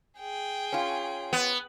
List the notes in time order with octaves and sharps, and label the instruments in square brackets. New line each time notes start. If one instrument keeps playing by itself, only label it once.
[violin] G#4 G5
[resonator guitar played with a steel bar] C#4 F4
[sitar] B3